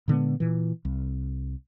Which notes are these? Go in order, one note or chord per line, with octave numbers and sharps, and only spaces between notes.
A#2 D3 G#3 B3
A#2 E3
C2